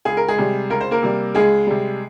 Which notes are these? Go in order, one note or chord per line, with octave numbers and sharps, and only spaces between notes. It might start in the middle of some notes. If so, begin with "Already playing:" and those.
C#2 G#4
A#4
G#3 G#4
C3 G3
C#2 A#4
C5
A#3 A#4
C3 G3
C#2 G#3 G#4
C3 G3